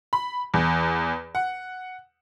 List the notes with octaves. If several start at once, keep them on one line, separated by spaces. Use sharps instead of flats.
B5
E2
F#5